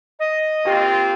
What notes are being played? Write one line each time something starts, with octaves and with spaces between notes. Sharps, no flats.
D#5
A#3 C4 F4 G4 C#6